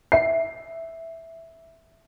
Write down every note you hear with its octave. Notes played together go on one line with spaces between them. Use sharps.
E5 C7